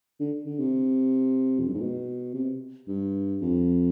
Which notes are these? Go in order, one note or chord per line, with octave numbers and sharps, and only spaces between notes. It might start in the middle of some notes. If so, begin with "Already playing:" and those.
D3
D3
C3
F2
G2
G#2
B2
C3
G2
F2